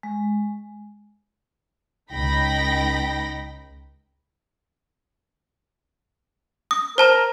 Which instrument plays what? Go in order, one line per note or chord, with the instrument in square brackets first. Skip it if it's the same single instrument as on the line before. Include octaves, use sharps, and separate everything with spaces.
[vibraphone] G#3
[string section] C#2 D#4 G5 B5 A#6
[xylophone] D#6
[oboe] A#4 [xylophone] C5 A5 A#5